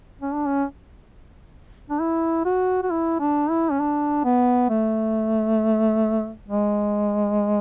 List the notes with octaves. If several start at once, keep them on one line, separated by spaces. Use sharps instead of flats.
C#4
D4
C#4
D4
E4
F#4
F#4
E4
D4
E4
C#4
D4
B3
A3
G#3